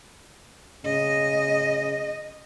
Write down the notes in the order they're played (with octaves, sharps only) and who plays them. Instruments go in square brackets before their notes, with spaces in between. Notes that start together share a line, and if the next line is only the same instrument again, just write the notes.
[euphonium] C#3 [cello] D#5